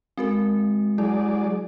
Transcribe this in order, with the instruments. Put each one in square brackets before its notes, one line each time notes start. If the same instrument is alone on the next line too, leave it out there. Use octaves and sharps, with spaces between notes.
[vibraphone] G#3 [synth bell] C4 F#4 A#4
[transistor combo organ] F#3 G#4 D5 [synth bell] E4